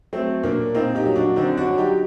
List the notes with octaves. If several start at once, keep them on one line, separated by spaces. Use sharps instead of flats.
F#3 A3 C4
A#2 A#3 D4
A#2 C4 D#4
D#4 G4
F#3
D4 F#4
D3 C4 D#4
D4 F#4
F#3
D#4 G4